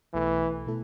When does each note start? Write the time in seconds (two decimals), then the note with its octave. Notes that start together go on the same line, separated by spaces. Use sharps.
0.14 B1 B2 E3 A3 E4 A4
0.67 B2 A3 E4 A4